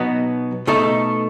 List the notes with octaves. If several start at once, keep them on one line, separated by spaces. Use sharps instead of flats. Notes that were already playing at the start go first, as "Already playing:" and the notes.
Already playing: B2 F#3 B3 D#4
B2 A3 D#4 A4